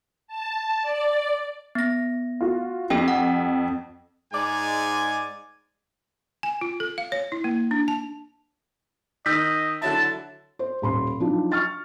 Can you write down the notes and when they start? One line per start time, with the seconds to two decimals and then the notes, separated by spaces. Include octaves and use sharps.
0.27 A5
0.82 D5
1.75 B3 A#6
2.41 F4 F#4
2.90 F2 G4 A4 G5
3.08 F#5
4.33 G#2 G#3 D5 G#5
6.43 G#5
6.61 F4
6.80 A4
6.98 F5
7.12 C#5
7.32 E4
7.44 A#3
7.71 D4
7.88 A5
9.26 D#3 D#5 E6 G6 B6
9.82 D3 F#3 E4 A5
10.59 C5
10.82 D#1 B5 C6
11.20 F3 F#3 D4 D#4
11.52 C#6 F6 A6